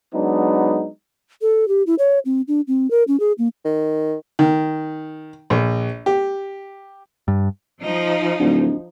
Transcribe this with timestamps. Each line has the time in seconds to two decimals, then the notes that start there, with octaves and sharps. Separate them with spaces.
0.14 F#3 G#3 B3 D4 D#4
1.42 A4
1.68 G4
1.87 E4
1.99 C#5
2.25 C4
2.48 D4
2.68 C4
2.91 A#4
3.08 C#4
3.20 G#4
3.38 A#3
3.65 D#3
4.39 D#3
5.50 A#1
6.06 G4
7.28 G2
7.83 F3 D#4
8.40 D1 D4 F#4